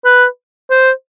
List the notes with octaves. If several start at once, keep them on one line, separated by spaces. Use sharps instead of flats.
B4
C5